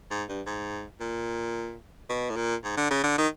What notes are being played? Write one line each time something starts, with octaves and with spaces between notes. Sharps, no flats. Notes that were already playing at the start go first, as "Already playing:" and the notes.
G#2
G2
G#2
A#2
B2
A2
A#2
G#2
D3
C#3
D3
D#3